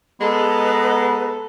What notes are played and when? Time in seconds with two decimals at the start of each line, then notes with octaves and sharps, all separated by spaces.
0.21 G#3 B3 A4 B4 D#5 A#5